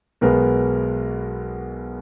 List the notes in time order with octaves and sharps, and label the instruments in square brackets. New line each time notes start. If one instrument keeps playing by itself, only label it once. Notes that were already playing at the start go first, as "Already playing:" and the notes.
[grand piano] B1 B2 G#3 B3 A#4